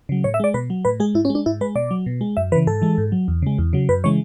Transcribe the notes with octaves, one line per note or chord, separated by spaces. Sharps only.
C#3 F#3
A2 C#5
E5
G#3 D5
B2 B4
F#3
A2 B4
G#3 G#4
G#2 E4
C#4
G#3
D4
G#2 E4
G#3 B4
B2 D5
F#3
B2
G#3
F#2 E5
C#3 E3 B4
G#2 A4
E3 G#3
G#2
F#3
E2
C#3 G#3
E2
C#3 F#3
F#2 B4
C#3 E3 G#3 C#5